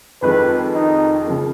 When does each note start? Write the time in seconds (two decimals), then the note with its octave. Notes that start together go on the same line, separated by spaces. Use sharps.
0.22 F2 D#3 G#3 B4
0.74 D#4
1.26 C#3 F3 A#3